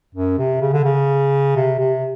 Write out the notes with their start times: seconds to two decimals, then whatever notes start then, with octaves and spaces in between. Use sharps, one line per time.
0.15 F#2
0.38 C3
0.61 C#3
0.73 D3
0.84 C#3
1.57 C3
1.79 C3